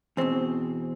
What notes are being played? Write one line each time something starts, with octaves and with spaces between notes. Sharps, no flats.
E2 B2 C4